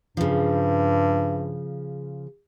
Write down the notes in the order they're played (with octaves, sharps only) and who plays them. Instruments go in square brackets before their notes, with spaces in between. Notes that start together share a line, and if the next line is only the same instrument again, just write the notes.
[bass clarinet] G2 [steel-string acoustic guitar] C#3 F3